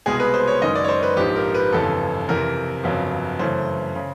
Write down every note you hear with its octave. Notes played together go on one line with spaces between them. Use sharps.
C2 B2 G#3 G#4
B4
C5
C#5
F#1 F#2 D#3 G#3 D#5
D5
C#5
C5
B4
A#1 G#2 F3 G4
A#4
B4
G1 F2 C#3 E3 A4
F2 C3 E3 A#4
G1 F2 C#3 F#3
F#2 C#3 E3 A3 C5
C#3